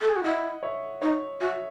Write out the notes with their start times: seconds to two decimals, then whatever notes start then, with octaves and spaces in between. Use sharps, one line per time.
0.01 A4
0.09 G#4
0.16 F#4
0.24 E4 D#5 F#5
0.63 C#5 E5
1.02 D#4 C#5
1.41 F#4 E5 G#5